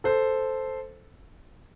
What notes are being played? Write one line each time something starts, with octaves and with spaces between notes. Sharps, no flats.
A4 C5